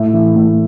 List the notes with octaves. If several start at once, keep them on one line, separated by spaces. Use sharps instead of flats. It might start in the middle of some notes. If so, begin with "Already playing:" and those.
Already playing: A2 E5
E3
A2